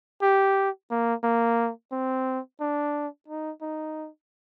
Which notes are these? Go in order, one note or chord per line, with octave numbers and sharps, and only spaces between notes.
G4
A#3
A#3
C4
D4
D#4
D#4